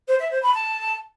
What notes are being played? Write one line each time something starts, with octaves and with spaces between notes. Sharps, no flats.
C5
E5
C5
B5
A5